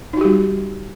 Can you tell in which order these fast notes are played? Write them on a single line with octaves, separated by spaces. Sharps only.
D#4 F#4 G4 G3